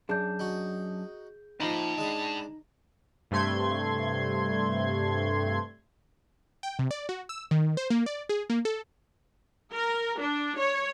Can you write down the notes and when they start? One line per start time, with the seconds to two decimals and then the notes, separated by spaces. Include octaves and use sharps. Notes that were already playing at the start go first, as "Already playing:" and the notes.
0.09 F#2 D4 G#4 G6
0.39 D#4 F#4
1.60 F3 A#3 D#4 A5 B5
1.98 G#3 D4 G#4
3.31 G2 C3 A3 C6 G#6
6.63 G5
6.79 C3
6.91 D5
7.09 F#4
7.29 E6
7.51 D#3
7.77 C5
7.90 A#3
8.06 D5
8.29 G#4
8.50 A#3
8.65 A4
9.73 A#4
10.19 D4
10.57 C#5